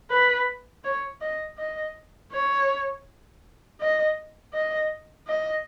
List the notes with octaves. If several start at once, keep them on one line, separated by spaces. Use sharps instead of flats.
B4
C#5
D#5
D#5
C#5
D#5
D#5
D#5